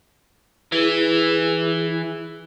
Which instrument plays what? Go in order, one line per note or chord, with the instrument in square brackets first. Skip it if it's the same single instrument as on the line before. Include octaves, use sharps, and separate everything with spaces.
[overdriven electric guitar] E3 [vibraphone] E4 G#4